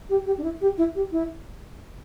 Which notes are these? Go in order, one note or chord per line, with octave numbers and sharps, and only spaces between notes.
G4
G4
D4
E4
G4
E4
G4
E4